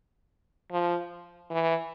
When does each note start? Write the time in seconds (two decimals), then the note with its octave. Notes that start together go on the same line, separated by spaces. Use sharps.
0.72 F3
1.51 E3